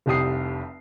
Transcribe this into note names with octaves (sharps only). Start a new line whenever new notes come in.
F1 C2 G4 D#6 C7